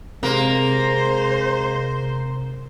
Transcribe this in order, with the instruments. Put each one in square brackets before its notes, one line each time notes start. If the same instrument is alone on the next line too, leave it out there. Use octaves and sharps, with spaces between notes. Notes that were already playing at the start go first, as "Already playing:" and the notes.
[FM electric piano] C3 A#5 [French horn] G#3 [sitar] A#3 [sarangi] C5